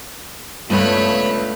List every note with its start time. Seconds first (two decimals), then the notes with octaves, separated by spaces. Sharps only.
0.70 C#2 G2 A3 B3 F4 C#5 B5 D#7